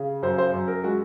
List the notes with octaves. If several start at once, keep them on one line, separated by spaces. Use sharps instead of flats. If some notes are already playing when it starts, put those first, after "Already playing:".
Already playing: C#3
F#2 C5
C5
F#2
A#4
G#3 F#4